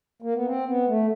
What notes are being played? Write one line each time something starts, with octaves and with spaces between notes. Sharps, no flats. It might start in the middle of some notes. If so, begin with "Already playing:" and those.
A#3
B3
C4
B3
A3